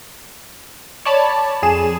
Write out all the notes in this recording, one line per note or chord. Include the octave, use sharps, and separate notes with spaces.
C#5 D5 A5 B5
F2 G#4 E7